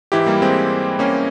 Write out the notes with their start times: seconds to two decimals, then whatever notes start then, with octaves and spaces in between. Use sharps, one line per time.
0.12 G#2 E3 E4 G4
0.26 G3 A#3
0.42 G#3 C4
0.99 A#3 C#4